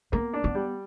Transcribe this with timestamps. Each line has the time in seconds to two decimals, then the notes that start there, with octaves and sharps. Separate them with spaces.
0.12 A#3 B3
0.33 D4
0.44 B3
0.55 G3